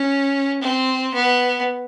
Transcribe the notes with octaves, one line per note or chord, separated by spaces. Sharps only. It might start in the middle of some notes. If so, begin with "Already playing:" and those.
Already playing: C#4
C4
B3